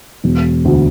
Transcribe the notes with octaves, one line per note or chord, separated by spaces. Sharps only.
E1
D2